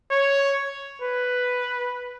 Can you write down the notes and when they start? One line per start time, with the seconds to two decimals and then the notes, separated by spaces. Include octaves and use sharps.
0.11 C#5
1.02 B4